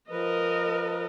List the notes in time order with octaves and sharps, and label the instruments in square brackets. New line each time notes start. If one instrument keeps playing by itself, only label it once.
[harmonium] F3 B4 [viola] A#4 D#5